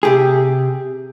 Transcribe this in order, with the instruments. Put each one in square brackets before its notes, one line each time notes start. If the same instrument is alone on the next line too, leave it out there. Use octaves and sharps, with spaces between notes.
[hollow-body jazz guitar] C3 G4 G#4